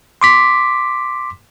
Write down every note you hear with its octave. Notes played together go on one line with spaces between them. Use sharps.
C6 D6 B6